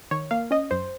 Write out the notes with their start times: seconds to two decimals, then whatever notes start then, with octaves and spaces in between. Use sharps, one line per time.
0.11 D#3 C#5
0.31 A#3 F5
0.51 C#4 D#5
0.71 F#2 C5